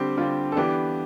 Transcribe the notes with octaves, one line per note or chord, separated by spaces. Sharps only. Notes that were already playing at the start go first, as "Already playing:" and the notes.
Already playing: D3 G3 C4 G4
D3 G3 C4 F4
A4
E3 B3 D4 G4